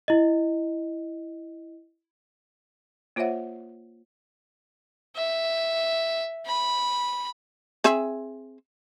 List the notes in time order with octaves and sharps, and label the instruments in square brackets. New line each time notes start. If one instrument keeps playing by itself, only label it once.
[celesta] E4 D#5
[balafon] A#3 F4 C5 C#5 E5 F#5
[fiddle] E5
B5
[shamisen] C4 G#4 E5